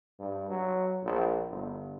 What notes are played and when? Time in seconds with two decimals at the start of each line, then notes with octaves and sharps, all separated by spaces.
0.20 G2
0.50 F#3
1.04 A#1
1.50 G1